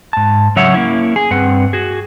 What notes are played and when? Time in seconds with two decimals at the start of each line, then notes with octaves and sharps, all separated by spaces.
0.13 G#2 A5
0.56 C#3 F#3 C#5 E5 F#5
0.74 A#3 C#4 E4
1.16 G#4
1.31 G2 C4 B4 F#5
1.73 F#4 G#4